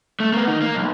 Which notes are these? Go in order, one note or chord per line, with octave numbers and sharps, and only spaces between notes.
A3
A#3 B3
D#3 D#4
A#3
B1